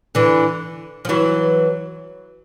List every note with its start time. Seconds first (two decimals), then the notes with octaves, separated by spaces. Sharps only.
0.15 D3 E3
1.05 F3
1.09 E3 F#3